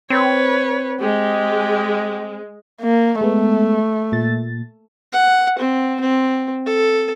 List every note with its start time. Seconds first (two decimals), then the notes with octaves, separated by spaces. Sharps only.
0.10 C4 B4 C#5
1.00 G#3 G4
2.81 A#3
3.21 G#3 A3 B3
4.12 A#2 A6
5.12 F#5
5.59 C4
6.00 C4
6.66 A4